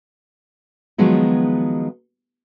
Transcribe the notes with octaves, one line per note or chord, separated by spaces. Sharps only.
D#3 F3 F#3 G#3 B3